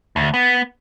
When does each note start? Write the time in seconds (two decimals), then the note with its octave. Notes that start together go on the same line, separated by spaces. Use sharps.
0.16 D2
0.34 B3